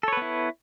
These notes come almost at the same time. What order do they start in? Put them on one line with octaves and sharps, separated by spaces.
A4 C#5 B4 B3 E4